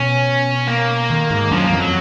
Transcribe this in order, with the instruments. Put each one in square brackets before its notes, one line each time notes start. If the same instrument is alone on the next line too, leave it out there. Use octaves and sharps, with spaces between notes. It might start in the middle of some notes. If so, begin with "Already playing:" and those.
Already playing: [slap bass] B2 [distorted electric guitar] C#4
[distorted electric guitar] A#3
[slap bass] D#3
G#2
[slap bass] F#2 [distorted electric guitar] F3
[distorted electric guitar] G#3
A#3
[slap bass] F2
[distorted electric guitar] F#3